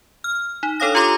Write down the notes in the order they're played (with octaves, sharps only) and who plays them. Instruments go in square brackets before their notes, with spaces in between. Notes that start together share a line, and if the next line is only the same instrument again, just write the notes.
[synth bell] F6
D#4
D4 A4 C#5 F5 D#6 A#6
F4 G4 A#5 C6 D6